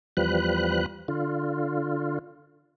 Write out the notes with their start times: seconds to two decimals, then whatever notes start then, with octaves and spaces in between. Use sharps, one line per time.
0.17 E2 F3 G3 B4 F#6
1.08 D3 F4